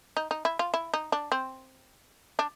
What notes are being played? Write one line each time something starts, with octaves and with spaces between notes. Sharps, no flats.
D#4
D#4
E4
F4
E4
D#4
D4
C4
D4